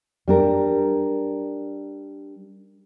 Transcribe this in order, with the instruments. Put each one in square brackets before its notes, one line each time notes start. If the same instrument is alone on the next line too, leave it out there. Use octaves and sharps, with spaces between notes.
[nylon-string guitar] G3 D4 A#4